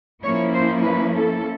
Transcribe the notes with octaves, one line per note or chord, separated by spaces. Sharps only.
F3 A#3 C#4 E4 C#5
C5
B4
A4